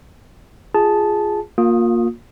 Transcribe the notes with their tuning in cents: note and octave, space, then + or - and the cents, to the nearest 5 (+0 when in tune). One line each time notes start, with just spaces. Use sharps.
F4 +0 G#4 +0 A5 -10
A#3 +0 F4 +30 D#6 +0